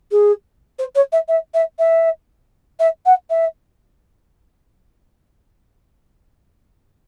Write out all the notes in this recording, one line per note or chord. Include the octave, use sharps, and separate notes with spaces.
G#4
C5
C#5
E5
E5
E5
E5
E5
F#5
E5